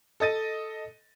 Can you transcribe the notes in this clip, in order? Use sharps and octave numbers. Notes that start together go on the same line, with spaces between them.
A4 D#5 A6 D#7